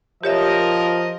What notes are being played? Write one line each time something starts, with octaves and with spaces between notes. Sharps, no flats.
F3 G4 A#4 C#5 D#5 E5